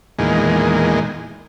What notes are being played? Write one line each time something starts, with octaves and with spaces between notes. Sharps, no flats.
E2 A#2 D#3 G#3